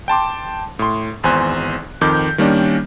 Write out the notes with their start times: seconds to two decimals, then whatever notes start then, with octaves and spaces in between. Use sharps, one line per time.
0.08 G5 A5 C6 D6
0.79 A2 C6
1.23 G#1 E2 C5 G#5 C6 F#6
2.01 F2 D#3 D6 G6
2.38 D#3 G3 A#3 C#4 D4